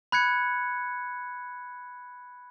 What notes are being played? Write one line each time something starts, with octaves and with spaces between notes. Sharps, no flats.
B5 F#6 G#6 C#7